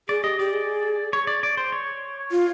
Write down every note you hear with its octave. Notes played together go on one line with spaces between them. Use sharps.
G#4 D5
G4 D#5
G4 D5
G#4
C#5
D5
D5
C5
C#5
F4